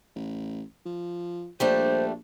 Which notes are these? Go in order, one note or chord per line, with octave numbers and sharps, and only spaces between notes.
A1
F3
A#1 G3 A3 D4 C5